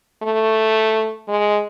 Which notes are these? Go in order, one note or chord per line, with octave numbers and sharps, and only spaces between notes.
A3
G#3